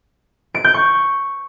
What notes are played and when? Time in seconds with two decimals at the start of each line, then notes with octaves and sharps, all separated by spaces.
0.55 D7
0.64 G6
0.74 C#6